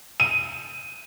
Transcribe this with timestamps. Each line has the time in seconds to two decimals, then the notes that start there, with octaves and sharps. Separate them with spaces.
0.20 D#7